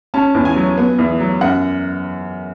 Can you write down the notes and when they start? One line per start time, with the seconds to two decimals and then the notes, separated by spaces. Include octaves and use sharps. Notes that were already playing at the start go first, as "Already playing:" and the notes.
0.14 C#4 A5
0.35 E2
0.45 G#5
0.56 F#3
0.78 B3
0.98 E2
1.20 F#3
1.41 F#2 F#5